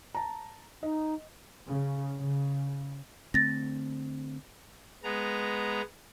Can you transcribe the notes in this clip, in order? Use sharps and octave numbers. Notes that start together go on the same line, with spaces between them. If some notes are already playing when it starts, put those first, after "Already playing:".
A5 A#5
D#4 D#5
C#3
C#3
D3 A3 C4 A6 A#6
G#3 B3 A#5